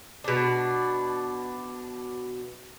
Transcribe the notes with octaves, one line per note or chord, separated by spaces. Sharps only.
B2 D4